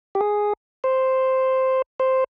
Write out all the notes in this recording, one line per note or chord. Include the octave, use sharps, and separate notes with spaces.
G4
G#4
C5
C5